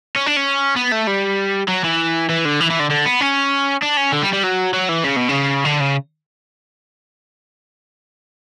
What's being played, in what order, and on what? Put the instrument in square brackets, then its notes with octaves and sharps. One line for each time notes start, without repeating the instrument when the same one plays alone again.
[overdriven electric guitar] C#4
D4
C#4
B3
A3
G3
F#3
E3
E3
D3
E3
E3
D3
D3
B3
C#4
D4
C#4
D3
G3
G3
F#3
F#3
E3
C#3
B2
C#3
D3
C#3